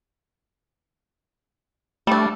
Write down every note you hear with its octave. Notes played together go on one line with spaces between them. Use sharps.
G3 A3 D4